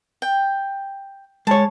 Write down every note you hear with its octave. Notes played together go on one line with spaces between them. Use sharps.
G5
G#3 C#5 A5